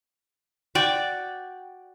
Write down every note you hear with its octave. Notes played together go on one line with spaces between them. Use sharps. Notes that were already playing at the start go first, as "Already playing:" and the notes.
F#4 D5 G5